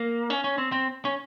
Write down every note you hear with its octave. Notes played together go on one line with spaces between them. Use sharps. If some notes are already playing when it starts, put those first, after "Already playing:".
Already playing: A#3
C#4
C#4
C4
C4
C#4